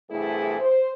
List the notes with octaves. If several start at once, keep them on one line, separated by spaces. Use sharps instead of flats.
E2 G2 C3 A3 E4 G#4
C5